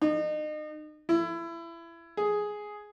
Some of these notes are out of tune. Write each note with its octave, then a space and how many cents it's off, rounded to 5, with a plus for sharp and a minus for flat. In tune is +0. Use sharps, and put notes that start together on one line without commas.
D#4 -35
E4 +25
G#4 +5